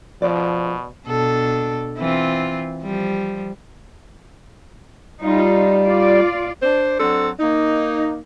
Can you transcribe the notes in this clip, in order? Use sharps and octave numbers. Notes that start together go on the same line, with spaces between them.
B2 F3 D5
B2 D4 A4
E3 C4 F4
F3 G3
G3 D#4 F4
F4 D5
D4 C5
F#3 C4 D4 A4
A#3 D#4